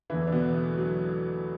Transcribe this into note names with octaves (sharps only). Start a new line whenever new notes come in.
E2 D3 E3 E4
D4
B2 B3
A3
F#3